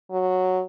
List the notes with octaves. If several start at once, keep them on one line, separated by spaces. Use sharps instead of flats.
F#3